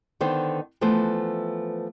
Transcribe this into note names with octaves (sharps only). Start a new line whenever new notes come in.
D3 D#3 B3 C5
E3 F3 A3 B3 C5